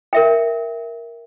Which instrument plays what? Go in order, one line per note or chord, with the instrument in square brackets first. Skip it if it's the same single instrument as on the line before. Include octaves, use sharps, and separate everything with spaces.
[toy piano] A#4 E5 G5